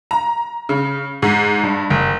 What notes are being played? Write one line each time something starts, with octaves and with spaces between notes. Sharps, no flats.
A#5
C#3
G#2
G2
F#1